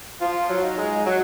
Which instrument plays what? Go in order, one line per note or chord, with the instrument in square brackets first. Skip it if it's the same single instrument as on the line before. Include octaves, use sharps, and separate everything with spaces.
[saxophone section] F3 [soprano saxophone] F4
[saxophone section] F#3
[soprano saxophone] D#4
[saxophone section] G#3
[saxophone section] F#3 [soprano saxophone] F#4